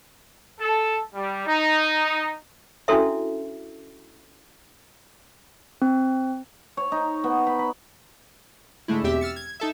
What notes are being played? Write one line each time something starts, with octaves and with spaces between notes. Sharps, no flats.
A4
G3
D#4
C#4 D4 E4 F#4 A4 E5
C4
C#5
D#4
B3
B5
B5
G#2 D3 G#3 A3 E4
E2 B2 C4 G4 E5
E6 F6 A6 C#7
G#6
D#4 A4 E5